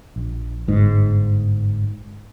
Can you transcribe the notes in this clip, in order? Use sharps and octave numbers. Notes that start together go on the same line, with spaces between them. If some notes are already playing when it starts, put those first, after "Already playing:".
A#1
G1 G#2